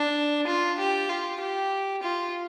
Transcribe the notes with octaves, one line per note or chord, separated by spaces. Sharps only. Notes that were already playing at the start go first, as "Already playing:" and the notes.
Already playing: D4
F4
G4
F4
G4
F4